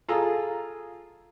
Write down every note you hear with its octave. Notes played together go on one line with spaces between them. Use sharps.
F4 G#4 A4 A#5